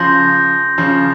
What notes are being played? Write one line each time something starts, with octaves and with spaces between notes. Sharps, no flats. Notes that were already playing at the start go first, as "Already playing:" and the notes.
Already playing: C#3 F3 C6 G6 A#6
C#3 F3